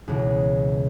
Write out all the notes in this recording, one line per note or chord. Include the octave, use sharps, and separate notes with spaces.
C#2 B2 E3